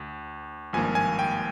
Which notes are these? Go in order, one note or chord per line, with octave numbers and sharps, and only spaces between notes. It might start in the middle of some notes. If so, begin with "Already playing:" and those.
Already playing: D2
G#1 G2 F3 A#3 G#5
G#5
G5